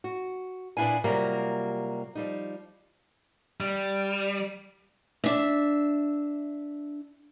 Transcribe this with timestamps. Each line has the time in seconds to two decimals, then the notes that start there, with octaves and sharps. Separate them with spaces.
0.04 F#4
0.77 A#2 B3 D4 E4 F5 G#5
1.04 C3 F#3 G3 A#3 F4 A#4
2.15 F3 G3 D#4
3.61 G3
5.24 D4 E5